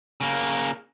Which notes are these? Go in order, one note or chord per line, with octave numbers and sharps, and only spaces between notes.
C#3 A#3